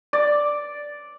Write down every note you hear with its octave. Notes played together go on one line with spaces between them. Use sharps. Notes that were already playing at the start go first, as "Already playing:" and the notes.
D5